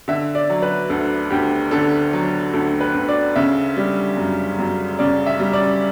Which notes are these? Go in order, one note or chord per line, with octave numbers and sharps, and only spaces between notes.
D3 E5
D5
F#3
B4
D2 A4
D2 G4
D3 A4
F#3
D2 A4
B4
D2
D5
C#3 E5
G3
F#2
F#2
C#3 D5
E5
G3
D5